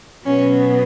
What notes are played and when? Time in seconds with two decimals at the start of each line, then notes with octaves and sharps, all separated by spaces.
0.25 B2 F#3 B3 C#4